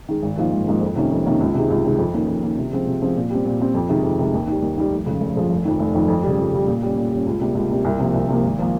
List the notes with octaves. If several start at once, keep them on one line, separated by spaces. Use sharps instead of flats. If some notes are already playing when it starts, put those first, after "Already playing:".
D#3 G#3
G#1
G#2 F3 A#3 F4
G#1
G#2 F3 A#3 F4
F2
C3 D#3 A#3 C#4
F2
C3 D#3 A#3 C#4
C#2
C3 D#3 G#3
C#2
C3 D#3 G#3
F2
D#3 A#3 C#4
F2
D#3 A#3 C#4
C3
F3 G#3 C4
C3
F3 G#3 C4
A#2
G3 C4
A#2
G3 C4
F2
C3 D#3 G#3
F2
C3 D#3 G#3
D#2
D#3 G3
D#2
D#3 G3
F1
F2 C#3 F3 G#3
F1
F2 C#3 F3 G#3
F1
F2 D#3
F1
F2 D#3
F2
C#3 G3
F2
C#3 G3
A#2
G3 C#4
A#2
G3
C#4
C#2
C3 G3 A#3
C#2
C3 G3 A#3
C2
C3 F3 A#3
C2
C3 F3 A#3
G#1
F3 A#3